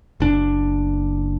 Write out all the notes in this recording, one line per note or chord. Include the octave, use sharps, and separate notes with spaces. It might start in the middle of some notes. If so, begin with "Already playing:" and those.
F#1 D4